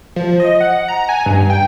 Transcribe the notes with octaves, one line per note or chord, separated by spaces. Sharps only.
F3
D#5
F#5
A#5
G#5
G2
G5